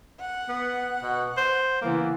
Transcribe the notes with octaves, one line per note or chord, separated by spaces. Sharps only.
F#5
B3
B2
C5
C#3 E3 A#3 B3